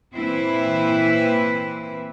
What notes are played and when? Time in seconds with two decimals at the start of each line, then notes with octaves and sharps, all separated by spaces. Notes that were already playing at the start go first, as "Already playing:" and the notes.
0.15 A#2 E3 C4 E4 B4